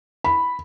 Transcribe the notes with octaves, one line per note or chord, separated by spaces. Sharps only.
B5